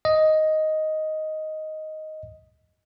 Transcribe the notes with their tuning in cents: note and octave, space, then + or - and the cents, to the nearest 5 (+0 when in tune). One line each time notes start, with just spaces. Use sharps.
D#5 +5